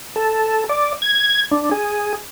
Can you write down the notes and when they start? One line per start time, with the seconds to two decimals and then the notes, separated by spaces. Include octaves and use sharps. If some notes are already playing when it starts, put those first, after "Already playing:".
0.16 A4
0.69 D5
1.02 G#6
1.51 D4
1.71 G#4